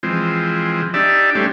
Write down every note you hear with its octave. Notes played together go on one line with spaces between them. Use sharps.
E3 F3 G#3 C4
D4 D#4 G4 D5 E5
G3 A3 C#4 D4 G4 C5